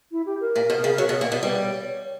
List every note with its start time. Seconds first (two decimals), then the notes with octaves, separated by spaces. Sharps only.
0.12 E4
0.26 G4
0.41 A#4
0.56 A#2
0.70 B2
0.84 C#3
0.98 F#3
1.09 B2
1.21 A#2
1.32 B2
1.42 G3 B4
1.64 C#5
1.86 C#5